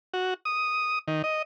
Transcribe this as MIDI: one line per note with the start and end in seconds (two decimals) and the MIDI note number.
0.14 0.34 66
0.45 0.99 87
1.08 1.22 51
1.24 1.42 75